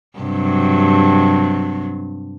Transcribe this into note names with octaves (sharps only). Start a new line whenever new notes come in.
G2 C3 F#3